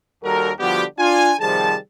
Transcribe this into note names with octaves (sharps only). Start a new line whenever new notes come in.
D#2 G3 F#4 A4 A#4
D3 F3 G3 B3 F#4 G4
D4 F4 G#5
C3 D#3 F3 G3 G#4 A5